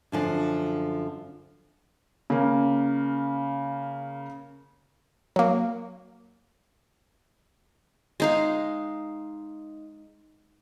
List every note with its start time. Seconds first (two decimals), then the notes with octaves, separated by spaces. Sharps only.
0.12 F#2 D3 F3
2.30 C#3 A#3
5.36 F#3 A#3
8.20 G#3 D#4 F5